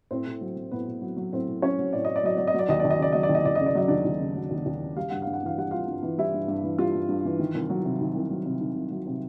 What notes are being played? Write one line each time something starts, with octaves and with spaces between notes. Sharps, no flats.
A2 C4 C5
A2
F#3
F#3
A2 B3 B4
A2
F#3
F#3
A2 C4 C5
A2
F#3 C#4 C#5
F#3
A2 D5
A2 D#5
D5
F#3 D#5
F#3 D5
D#5
F#3 D5
D#2 D#5
D5
D#2
D#5
C#3 D5
F#3 D#5
D5
D#2
D#5
D#2 D5
C#3 D#5
D5
F#3 D#5
D#2 D4 D5
D#2
C#3
F#3
D#2
D#2
C#3
G3 F5
G2 F#5
G2 F5
F#5
E3 F5
G3 F#5
G2 F4 F5
G2
E3
G3 E4 E5
G2
G2
E3
G3 F4 F5
G2
G2
E3
D#3
C2
F#3
C3
D#3
C2
F#3
C3
D#3
C2
F#3
C3